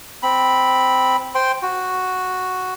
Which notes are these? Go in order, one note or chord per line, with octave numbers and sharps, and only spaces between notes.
C4 B5
C5 G5 C6
F#4